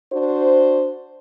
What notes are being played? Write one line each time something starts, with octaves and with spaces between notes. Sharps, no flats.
D4 F#4 C5